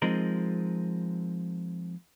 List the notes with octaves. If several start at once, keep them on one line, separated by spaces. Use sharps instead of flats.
F3 G#3 C4 D#4 A#4